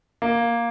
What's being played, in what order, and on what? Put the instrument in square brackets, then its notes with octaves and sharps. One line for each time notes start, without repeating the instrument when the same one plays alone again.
[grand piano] A#3